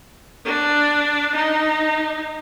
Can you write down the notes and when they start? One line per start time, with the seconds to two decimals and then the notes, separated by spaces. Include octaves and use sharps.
0.45 D4
1.36 D#4